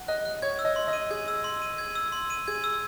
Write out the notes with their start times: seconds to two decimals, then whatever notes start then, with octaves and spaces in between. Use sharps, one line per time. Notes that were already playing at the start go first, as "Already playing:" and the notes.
Already playing: F#5
0.08 D#5 F#6
0.25 F#6
0.42 C#5 G#6
0.59 E6
0.65 D#5
0.76 C6
0.88 D#5
0.93 D#7
1.10 G#4 G#6
1.28 E6
1.44 C6
1.62 D#7
1.78 G#6
1.95 E6
2.12 C6
2.30 D#7
2.48 G#4 G#6
2.64 E6